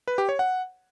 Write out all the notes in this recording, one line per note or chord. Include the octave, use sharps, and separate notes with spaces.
B4
G4
C#5
F#5